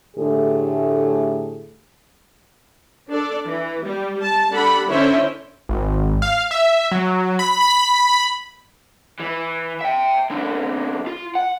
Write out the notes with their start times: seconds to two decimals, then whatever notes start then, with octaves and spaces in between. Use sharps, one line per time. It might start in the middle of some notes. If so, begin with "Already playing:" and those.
0.17 A2 D3 A3 G4 G#4
3.09 D4 A4 D5
3.45 E3
3.85 G3
4.22 A5
4.52 G3 D4 A4 F#5 B5
4.90 D3 C#4 E4 C5 C#5 E5
5.69 G#1
6.22 F5
6.51 E5
6.92 F#3
7.39 B5
7.61 B5
9.20 E3
9.81 E5 G5
10.30 C2 D3
11.07 F4
11.35 F#5